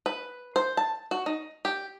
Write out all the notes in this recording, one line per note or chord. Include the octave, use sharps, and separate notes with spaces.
B4
C5
A5
F#4
D#4
G4